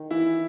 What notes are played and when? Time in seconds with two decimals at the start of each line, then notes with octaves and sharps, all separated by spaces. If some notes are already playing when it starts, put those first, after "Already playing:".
Already playing: D#3
0.11 E3 E4